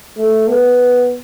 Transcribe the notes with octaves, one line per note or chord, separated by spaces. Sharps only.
A3
B3